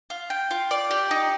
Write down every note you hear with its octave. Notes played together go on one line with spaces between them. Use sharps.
F4
G5
F4
D5
G4
D#4